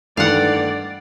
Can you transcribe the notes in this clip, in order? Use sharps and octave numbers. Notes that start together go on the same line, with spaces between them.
G2 D#3 E3 A3 D5 F5 F#5